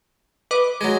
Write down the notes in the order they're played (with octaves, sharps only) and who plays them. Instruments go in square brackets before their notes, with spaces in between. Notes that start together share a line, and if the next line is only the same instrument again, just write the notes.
[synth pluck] B4 D#5 D6
[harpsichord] F#3 G#3